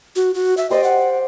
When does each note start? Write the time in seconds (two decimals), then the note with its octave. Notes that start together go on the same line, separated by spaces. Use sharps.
0.16 F#4
0.34 F#4
0.57 E5
0.70 G4 C5 D5 D#5
0.83 F#5